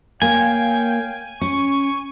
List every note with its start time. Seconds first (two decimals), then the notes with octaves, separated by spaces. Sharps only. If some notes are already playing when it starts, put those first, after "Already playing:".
0.22 A#3 C#5 F5 G5 G#5
1.41 C#4 C#6